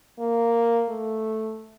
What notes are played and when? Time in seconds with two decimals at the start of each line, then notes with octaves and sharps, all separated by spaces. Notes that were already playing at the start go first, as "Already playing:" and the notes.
0.20 A#3
0.89 A3